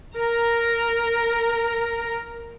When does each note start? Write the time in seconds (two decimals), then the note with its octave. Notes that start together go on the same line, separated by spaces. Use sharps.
0.17 A#4 A#5